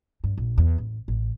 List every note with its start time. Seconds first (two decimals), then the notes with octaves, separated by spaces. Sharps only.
0.24 G2
0.38 A#1
0.58 E2
0.78 A1
1.08 A1